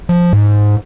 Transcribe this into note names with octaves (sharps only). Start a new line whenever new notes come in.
F3
G#2